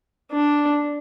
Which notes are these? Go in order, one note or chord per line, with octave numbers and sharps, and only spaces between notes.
D4